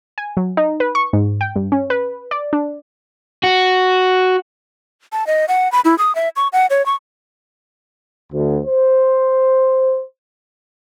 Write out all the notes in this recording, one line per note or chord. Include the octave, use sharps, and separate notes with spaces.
G#5
F#3
D#4
B4
C#6
G#2
G5
G2
C#4
B4
D5
D4
F#4
A5
D#5
F#5
B5
E4
D#6
E5
C#6
F#5
C#5
C#6
D2
C5